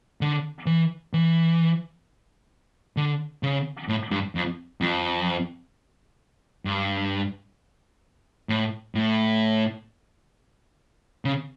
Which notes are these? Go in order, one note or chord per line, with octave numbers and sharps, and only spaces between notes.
D3
E3
E3
D3
C#3
A2
G2
F2
F2
G2
A2
A2
C#3